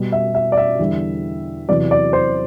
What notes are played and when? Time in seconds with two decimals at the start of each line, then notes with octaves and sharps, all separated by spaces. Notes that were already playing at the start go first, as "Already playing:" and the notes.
Already playing: B2 G3
0.12 E5
0.35 E5
0.52 D5
0.57 E5
0.79 E2 D3 G3
1.69 E2 C3 F#3 D5
1.91 D5
2.13 C5